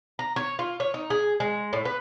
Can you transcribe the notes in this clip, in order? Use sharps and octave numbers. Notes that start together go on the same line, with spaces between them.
A#5
C#5
F4
C#5
D#4
G#4
G#3
A2
B4